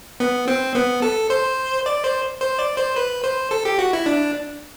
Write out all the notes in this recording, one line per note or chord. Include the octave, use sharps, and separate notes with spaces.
B3
C4
B3
A4
C5
D5
C5
C5
D5
C5
B4
C5
A4
G4
F#4
E4
D4